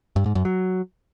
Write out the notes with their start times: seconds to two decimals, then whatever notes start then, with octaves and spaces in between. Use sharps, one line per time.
0.16 G2
0.26 G#2
0.35 F#2
0.45 F#3